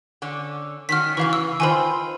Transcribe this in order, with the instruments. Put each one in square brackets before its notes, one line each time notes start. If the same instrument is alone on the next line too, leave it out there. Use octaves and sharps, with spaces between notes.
[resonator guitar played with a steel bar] D3 C#4
[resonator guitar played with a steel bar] D#3 C#4 F#4 [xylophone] F6 B6
[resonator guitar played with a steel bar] C#3 E3 [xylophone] B4 F5
[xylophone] E6
[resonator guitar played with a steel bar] D#3 F4 C5 [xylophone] G#5 B5